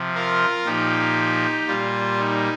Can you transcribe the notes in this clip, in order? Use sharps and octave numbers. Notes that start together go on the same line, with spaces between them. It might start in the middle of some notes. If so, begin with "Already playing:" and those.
Already playing: C3 F3
F4 A#4
A#2 F3 D#4 G4
A#2 G3 F4
D#4